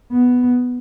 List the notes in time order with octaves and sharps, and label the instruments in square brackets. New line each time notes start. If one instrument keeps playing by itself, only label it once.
[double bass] B3